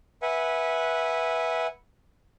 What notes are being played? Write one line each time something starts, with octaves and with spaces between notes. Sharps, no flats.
B4 E5 F#5 G#5